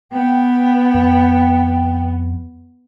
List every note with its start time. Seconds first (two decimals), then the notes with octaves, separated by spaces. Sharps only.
0.12 B3 G5
0.94 F2